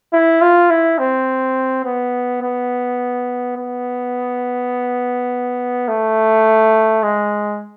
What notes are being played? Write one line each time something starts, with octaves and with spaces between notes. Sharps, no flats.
E4
F4
E4
C4
B3
B3
B3
A3
G#3